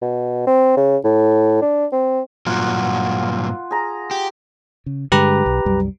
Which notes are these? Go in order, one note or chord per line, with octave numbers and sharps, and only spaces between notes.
B2
C4
C#3
A2
D4
C4
G2 A#2 F#3 F4 F#5
G#4 A#5
G4
C#3
G2 D3 G#3 G4 B4 A#5
B1
C2 F#2 G3